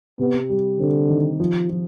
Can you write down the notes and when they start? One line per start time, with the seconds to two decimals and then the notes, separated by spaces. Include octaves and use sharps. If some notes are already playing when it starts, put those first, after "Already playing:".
0.19 C3 B3
0.49 G3
0.80 D3 C4
1.09 D#3
1.40 F3
1.70 F3